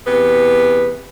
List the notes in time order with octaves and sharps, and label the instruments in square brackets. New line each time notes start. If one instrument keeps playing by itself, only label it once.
[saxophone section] E2 C3 B3 B4